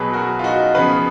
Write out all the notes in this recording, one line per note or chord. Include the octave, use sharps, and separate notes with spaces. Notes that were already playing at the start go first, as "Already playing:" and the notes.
Already playing: B2 F#3 B3 G#4 B4
F#4 A#4
F4
D#4 F#4
C#3 F3 B3 G#4 B4